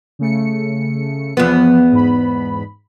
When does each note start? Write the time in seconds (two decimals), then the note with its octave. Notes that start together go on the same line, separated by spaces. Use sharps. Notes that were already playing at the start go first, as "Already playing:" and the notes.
0.19 C#3 A3 C#7
1.37 E2 F3 B3
1.92 G#2 B5